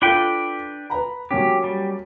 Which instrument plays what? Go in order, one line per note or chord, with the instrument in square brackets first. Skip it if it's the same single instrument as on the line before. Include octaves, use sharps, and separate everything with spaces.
[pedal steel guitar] D4 B4 G5 [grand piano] F4 A4
[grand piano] B4 A#5 B5
[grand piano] F#3 A#3 C#4 [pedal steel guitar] G4
[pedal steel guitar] G3